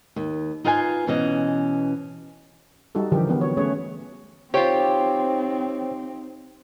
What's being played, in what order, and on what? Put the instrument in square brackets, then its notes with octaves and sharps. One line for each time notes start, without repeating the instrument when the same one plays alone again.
[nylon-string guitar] D#2
D#4 F4 B4 F5 F#5 G#5
B2 E3 C#4 D#5
[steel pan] G3 D#4 F#4 A4
D3 E3 F3 G4 A#4
E3 F#3 B3
F#4 C#5
A3 C#4 G#4 B4 C#5
[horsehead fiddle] C4 D#4 [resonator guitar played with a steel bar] F4 G4 [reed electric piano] C5 C#5 G5